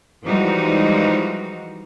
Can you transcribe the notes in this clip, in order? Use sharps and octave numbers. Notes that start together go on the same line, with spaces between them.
E3 F3 G3 G#3 D#4 F#4